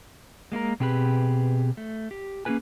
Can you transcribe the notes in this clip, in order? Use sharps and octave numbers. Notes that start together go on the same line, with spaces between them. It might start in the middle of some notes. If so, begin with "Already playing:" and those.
G#3 A#3 E4 A#4
B2 C4 G4 G#4 B4
A3
G4
A#3 C#4 G4 G#4 B4 G#5